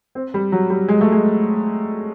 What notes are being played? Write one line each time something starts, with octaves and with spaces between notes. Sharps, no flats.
C4
G3
F#3
G3
G#3
A3
G#3